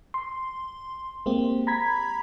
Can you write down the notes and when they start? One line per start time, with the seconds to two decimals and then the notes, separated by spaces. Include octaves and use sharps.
0.14 C6
1.26 G#3 A#3 C4 G4
1.67 A#5 B5 G#6 B6